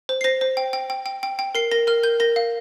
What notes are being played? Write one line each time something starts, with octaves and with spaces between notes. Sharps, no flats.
C5
C7
C5 A#6
C5
G5
G5
G5
G5
G5
G5
A#4 C7
A#4 A#6
A#4 F6
A#4 G6
A#4 A#6
F5